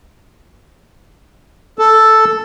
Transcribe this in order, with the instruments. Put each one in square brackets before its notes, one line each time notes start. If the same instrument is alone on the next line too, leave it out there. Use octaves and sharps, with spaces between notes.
[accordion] A4